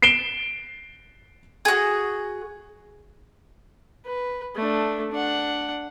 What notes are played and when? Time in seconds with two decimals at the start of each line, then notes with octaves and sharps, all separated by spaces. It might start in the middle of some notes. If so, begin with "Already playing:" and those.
0.02 C7 D7 E7 G7
1.65 F#4 G#4
4.06 B4
4.56 A3 D4
5.12 D4 F#5